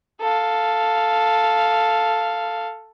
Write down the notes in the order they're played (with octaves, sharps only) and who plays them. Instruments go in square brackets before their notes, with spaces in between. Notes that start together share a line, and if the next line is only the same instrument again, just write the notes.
[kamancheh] A4 F5